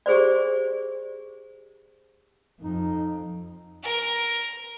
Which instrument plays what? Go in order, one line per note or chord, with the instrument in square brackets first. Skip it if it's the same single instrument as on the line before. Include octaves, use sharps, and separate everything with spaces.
[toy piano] G4 G#4 C5 D5
[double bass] F2 [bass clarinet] D#4
[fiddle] A#4